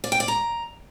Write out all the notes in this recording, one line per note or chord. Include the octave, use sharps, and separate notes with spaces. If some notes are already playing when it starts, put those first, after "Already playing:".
D5
G5
D5
A#5